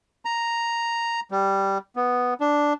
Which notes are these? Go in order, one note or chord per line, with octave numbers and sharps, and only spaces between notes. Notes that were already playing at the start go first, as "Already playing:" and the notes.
A#5
G3
B3
D4